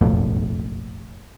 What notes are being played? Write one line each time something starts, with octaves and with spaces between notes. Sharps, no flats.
F#1 B1 F2 A2